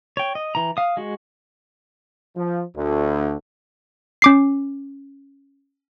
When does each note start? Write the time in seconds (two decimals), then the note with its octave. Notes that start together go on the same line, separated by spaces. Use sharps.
0.17 C#5 G5
0.35 D#5
0.55 E3 A#5
0.77 F5 D#6
0.97 G#3 F#4
2.37 F3
2.76 D2
4.22 C#4 D6 C7